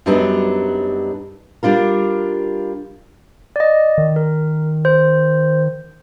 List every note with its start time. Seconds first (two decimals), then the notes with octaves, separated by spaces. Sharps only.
0.06 F#2 F#3 G3 B3 D4 D#4
1.63 G3 D4 F4 A#4
3.56 D5 D#5
3.98 D#3
4.16 A#4
4.85 C5